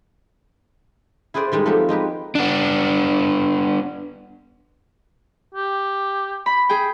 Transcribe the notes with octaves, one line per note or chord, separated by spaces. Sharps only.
E4 G#4 B4 C5 D5
D#3 G3 G#3 D#4
F3 A3 B3 C4 G4
G#3 D#4 G4 B4
B3 D4
G4
B5
G#4 G5